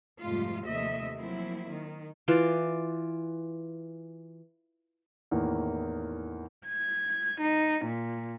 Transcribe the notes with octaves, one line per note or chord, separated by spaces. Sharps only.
F2 G#2 C3 G3 A3 F4
D#2 C3 F3 A3 D#5 E5
F3 F#3 A#3 C4 E4
D#3
E3 F4 D5
E2 A2 D#3 A#3
G#6
D#4
A#2